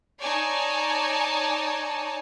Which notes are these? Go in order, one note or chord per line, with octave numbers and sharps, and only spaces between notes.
D#4 C#5 D5 G#5 A5